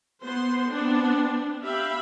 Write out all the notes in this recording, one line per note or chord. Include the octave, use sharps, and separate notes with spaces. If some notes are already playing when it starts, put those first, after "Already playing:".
B3 C5 C6
B3 C4 D4
G4 E5 F5 B5